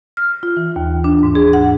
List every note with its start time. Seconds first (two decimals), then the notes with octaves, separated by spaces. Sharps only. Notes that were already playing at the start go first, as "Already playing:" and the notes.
0.17 F6
0.43 F4
0.57 E3
0.76 D#2
1.04 D4
1.23 G#2
1.35 G#4
1.53 F#5